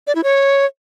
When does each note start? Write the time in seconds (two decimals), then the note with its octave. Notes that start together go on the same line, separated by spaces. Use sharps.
0.07 D5
0.15 E4
0.24 C#5